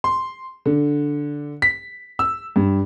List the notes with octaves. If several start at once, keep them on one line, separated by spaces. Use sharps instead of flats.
C6
D3
B6
E6
G2